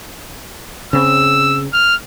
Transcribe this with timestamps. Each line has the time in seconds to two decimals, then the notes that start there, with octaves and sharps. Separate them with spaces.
0.93 C#3 C4 E6
1.73 F6